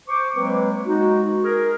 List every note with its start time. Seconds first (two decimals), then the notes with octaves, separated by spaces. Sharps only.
0.08 C5 C#6 D6
0.36 F#3 G#3 A#3 C4 B4
0.86 G#3 D#4 F#4
1.44 G#4 A#4